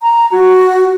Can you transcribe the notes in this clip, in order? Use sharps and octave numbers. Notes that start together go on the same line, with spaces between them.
A#5
F#4